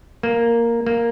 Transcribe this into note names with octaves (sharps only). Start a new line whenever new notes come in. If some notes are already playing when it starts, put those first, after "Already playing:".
A#3
A#3